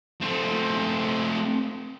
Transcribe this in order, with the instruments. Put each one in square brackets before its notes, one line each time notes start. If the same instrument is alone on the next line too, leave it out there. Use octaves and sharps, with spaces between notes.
[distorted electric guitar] A3 C4